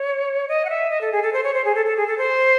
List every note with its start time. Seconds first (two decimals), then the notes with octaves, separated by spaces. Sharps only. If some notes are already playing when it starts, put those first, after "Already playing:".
Already playing: C#5
0.48 D#5
0.65 F#5
0.69 E5
0.90 D#5
1.01 A4
1.12 G#4
1.22 A4
1.33 C5
1.43 C#5
1.54 C5
1.65 G#4
1.75 A4
1.86 A4
1.96 G#4
2.07 A4
2.18 C5